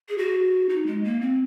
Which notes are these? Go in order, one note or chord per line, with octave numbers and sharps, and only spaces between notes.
G#4
F#4
D#4
G#3
A#3
C4